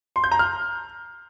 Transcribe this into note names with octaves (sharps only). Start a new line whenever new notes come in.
C6
G6
A#5
F6